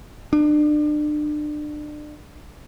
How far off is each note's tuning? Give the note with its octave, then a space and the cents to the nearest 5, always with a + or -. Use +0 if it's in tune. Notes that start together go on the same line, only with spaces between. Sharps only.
D4 +30